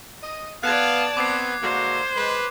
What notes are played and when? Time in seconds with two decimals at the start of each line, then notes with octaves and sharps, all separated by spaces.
0.23 D#5
0.63 B3 D5 F5 A5 F#6 G#6
1.17 B3 C4 D6 C7
1.62 D3 G#3 A#3 F#4 C5
2.17 G#3 B4